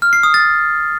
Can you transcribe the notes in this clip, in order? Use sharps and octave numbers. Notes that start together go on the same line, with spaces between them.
F6
C7
D#6
A6